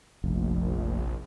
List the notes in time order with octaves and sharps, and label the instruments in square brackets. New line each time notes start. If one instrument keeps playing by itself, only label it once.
[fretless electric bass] F1 [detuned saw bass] A#1